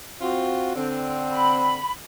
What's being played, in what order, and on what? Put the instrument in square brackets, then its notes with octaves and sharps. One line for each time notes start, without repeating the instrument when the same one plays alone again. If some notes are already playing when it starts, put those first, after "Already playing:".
[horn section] C4 F4 F#4
D3 C4
[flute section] B5